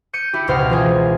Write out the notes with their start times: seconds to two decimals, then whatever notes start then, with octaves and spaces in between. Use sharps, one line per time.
0.13 G6 C#7 D#7
0.33 E4 G4
0.48 C#2 B2 C5 F6
0.70 E3 F4 G#4